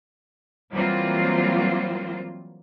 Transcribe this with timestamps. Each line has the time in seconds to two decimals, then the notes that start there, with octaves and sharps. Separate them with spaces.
0.71 E3 F#3 G3 A#3 C4 F4